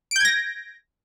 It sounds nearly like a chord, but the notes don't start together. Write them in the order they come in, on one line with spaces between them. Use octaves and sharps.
D7 G6 G#6 A#6